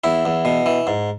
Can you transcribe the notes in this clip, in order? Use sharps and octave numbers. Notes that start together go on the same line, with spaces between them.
E2 E4
E2
B2
E3
G#2